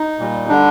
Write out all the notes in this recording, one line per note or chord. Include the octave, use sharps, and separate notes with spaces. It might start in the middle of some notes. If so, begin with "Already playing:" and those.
Already playing: D#4
A#2 G3
D3 G3 D4